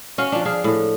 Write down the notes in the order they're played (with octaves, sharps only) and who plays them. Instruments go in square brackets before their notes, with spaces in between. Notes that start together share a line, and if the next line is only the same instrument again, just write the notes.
[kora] C#4 F#4 F5
F3 D4
D4 G#4 F5
A2